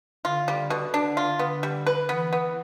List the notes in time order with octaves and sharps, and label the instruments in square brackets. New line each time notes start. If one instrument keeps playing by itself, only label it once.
[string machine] D3 [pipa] F4
[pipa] G3
B2
D4
F4
B3
G3
B4
[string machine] E3 [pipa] B3
[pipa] B3